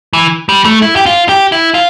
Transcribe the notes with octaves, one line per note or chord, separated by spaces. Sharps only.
E3
G3
A3
E4
G4
F4
G4
E4
F4